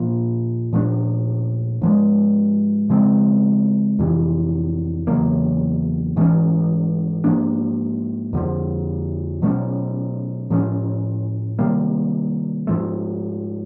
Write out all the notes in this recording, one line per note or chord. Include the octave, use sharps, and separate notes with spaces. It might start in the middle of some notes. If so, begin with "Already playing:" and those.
Already playing: A#2 F3 A#3
A#2 F3 A3 D4
G#2 F3 G#3
C#3 F3 G#3 C4
F2 C3 E3
E2 C#3 F#3 A#3
G#2 E3 A3 C#4
G#2 F3 A#3 D4
F2 D3 F3
B2 F#3 A3 C#4
A2 F3 A3 C#4
C3 D#3 G3 A#3
G#2 F3 A3